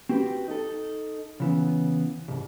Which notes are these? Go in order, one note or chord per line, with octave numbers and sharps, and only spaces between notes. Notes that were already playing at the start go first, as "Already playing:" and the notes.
C4 F#4 G4 B4
D#4 A4
C#3 E3 B3
C2 G#2